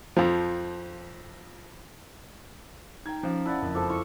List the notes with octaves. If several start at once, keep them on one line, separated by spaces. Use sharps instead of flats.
F2 F3
D#4 G5 A#5 G#6
F3 C#4 C5 F5
E4 D5 F#5 A5 F#6 A6
F#1 F2
F3 A4 D6
E4 C#6